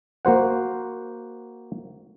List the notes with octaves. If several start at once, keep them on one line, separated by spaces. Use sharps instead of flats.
A#3 F#4 C5 F#5